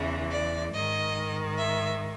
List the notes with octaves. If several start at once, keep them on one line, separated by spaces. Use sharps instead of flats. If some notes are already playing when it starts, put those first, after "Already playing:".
Already playing: E2 C#3 E3
D5
G#2 D#3 D#5
E5